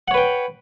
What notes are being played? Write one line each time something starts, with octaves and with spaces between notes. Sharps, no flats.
B4 C#5 F#5 G5